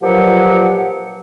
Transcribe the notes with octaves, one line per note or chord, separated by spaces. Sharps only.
G2 A#2 F3 F#3 G4 F#5